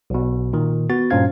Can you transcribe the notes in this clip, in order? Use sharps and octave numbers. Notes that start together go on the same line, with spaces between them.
B1 B2
A#2 D#3
B3 F#4 A6
G2 A#2 C#4 C5 F5 G#6